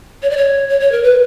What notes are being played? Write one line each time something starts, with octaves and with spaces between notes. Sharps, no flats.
C#5
D5
C#5
C#5
C#5
A#4
B4